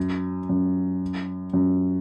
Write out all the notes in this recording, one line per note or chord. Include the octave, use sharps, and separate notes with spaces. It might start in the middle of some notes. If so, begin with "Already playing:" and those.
Already playing: F#2
F#2
F#2